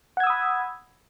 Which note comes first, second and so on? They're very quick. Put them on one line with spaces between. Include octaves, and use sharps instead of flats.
F#5 G#6 E6 D#6 B5